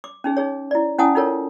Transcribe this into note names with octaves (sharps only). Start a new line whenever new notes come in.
D6
C#4 D#4 G#4
D#4 G#4 C#5
E4 D5
C#4 E4 F#5 G#5 A5 D#6
D#4 F4 A4 A#4 C#5